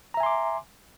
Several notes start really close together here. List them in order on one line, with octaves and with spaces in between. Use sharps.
A#5 E5 G#5 C6 D6